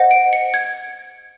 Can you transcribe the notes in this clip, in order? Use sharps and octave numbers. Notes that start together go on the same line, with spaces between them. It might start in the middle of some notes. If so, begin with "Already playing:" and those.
Already playing: C5 D#5 F#5
D7
C#7
G#6